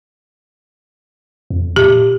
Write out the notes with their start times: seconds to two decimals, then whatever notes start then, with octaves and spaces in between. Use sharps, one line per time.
1.50 F2
1.76 A#2 G4